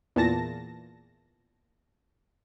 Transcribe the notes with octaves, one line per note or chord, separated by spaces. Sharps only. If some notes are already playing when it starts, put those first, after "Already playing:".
E2 A#2 A5 A#6